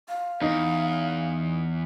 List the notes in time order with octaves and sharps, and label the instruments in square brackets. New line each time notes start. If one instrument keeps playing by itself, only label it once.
[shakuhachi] F5
[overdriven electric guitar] E2 [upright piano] D#4